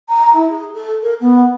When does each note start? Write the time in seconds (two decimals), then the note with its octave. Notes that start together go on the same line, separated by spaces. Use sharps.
0.09 A#5
0.33 E4
0.49 G#4
0.74 A4
1.02 A#4
1.20 B3